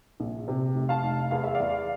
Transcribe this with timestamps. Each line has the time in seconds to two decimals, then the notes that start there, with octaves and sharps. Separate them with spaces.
0.20 A#1
0.48 C3
0.75 F1
0.89 F5 A5
1.04 F1
1.31 E2 F5
1.44 E5
1.55 D5 F5
1.60 E2